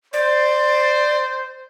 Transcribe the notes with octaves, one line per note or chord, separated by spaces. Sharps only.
C5 D5